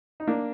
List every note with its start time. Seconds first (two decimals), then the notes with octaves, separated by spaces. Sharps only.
0.20 D#4
0.28 A#3 D4